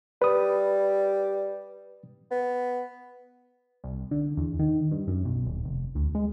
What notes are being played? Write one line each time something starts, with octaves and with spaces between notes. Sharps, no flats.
G3 B4 D#6
B3
C2
D3
E2
D#3
G2
F#2
B1
D#1
F1
D2
G#3